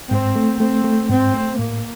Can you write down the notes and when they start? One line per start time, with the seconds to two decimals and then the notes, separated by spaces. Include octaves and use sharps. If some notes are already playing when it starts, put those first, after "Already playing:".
0.10 G#2 C4
0.36 A3
0.60 A3 C4
0.84 A3
1.09 G#2 C4
1.34 A3
1.59 A2 A#3